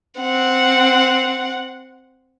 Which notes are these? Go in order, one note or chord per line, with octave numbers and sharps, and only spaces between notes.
C4 F#5